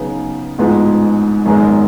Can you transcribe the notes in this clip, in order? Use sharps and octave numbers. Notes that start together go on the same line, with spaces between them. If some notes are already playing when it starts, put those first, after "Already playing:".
Already playing: C#3 F#3 B3 D#4
A1 G#2 F3 G#3 B3
G#1 F#2 D#3 G#3 B3